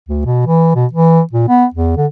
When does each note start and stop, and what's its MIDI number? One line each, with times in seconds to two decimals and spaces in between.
0.09 0.21 38
0.25 0.46 47
0.47 0.72 52
0.75 0.86 47
0.93 1.21 52
1.33 1.47 46
1.49 1.65 59
1.74 1.95 40
1.97 2.06 50